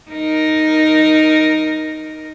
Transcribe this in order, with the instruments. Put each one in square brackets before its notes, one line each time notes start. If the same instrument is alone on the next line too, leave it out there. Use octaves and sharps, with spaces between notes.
[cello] D#4 A#4